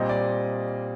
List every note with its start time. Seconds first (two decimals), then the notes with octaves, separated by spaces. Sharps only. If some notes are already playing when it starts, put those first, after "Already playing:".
Already playing: A#2 G3 C4 D#5
0.09 D5